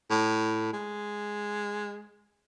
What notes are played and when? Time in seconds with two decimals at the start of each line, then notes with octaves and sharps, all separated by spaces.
0.10 A2
0.73 G#3